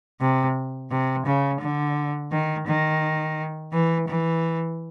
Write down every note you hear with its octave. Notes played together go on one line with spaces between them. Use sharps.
C3
C3
C#3
D3
D#3
D#3
E3
E3